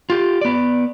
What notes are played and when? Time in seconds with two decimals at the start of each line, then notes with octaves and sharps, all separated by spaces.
0.10 F4 G4
0.41 B3 D5